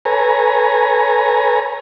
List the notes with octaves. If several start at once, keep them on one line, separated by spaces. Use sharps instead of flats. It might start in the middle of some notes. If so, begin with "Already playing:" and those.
A4 B4 C#5 G#5 A#5